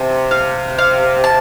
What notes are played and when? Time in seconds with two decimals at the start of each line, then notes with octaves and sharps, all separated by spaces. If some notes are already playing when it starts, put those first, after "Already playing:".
Already playing: C3 A5
0.31 F5
0.79 F5
1.24 A5